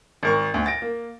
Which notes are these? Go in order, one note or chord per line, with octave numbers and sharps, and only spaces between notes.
G#1 A#4 C#6
D2
A6 A#6 D7
A#3